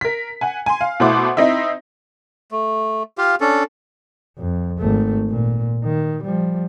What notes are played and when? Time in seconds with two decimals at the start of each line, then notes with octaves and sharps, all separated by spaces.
0.01 A#4 B6
0.41 F#5 G#5
0.66 G#5 C6
0.81 F5
1.00 B2 A3 E4 C5 F#5 D6
1.37 C4 D#4 E4 E5
2.52 A3
3.18 F4 G4 F5
3.41 C#4 D4 A4
4.38 F2
4.79 G#1 A3
5.30 A#2
5.84 D#3
6.23 F3 G3